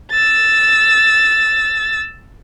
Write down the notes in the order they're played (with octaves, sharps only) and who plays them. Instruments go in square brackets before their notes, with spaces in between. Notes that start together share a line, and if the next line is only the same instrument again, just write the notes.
[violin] E6 A6